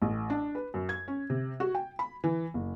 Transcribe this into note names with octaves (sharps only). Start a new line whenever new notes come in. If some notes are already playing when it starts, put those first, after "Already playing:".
A1
D4
B4
F#2
G#6
C#4
C3
F#4
G5
B5
E3
F#1